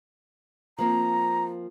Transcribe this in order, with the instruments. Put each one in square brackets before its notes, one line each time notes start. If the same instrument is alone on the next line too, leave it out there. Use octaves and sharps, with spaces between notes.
[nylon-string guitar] F3 A#3 C4 [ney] A#5